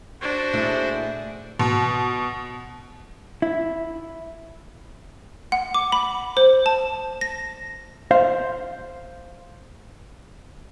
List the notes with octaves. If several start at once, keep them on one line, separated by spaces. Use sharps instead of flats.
D4 F#4 C5
A#2 A3 E4 G#4
B2
E4
F#5
D6
B5
C5
A5
A#6
C5 F5